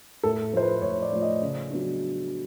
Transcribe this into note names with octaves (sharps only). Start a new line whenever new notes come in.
A2 A4
F3 A3 C5
B4
A2 C#5
D5
F3 A3
D#5
C#3
F#3 B3 D4